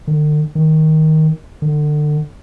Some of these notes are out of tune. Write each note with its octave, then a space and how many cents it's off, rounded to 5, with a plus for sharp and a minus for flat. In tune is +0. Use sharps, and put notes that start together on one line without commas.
D3 +45
D#3 +10
D3 +30